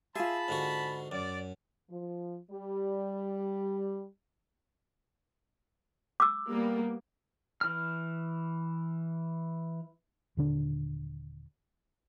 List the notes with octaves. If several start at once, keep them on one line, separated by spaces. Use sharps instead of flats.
F4 G#4 E5 A5 B5
G#2 D3 F#4
F#2 D5
F3
G3
D6 E6
G3 A#3 B3
E3 F6
D#1 D3 D4